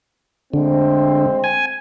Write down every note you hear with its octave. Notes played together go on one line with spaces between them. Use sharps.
D3 G#3 A3 C4
G#5